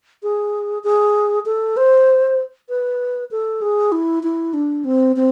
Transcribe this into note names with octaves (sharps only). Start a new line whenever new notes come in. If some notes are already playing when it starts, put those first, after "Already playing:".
G#4
G#4
A4
C5
B4
A4
G#4
E4
E4
D4
C4
C4